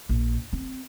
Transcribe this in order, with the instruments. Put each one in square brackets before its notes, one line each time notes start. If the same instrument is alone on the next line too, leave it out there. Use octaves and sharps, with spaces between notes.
[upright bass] A#1
C4